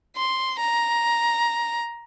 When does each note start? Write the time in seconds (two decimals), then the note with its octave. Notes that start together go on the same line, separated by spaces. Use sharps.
0.17 C6
0.60 A#5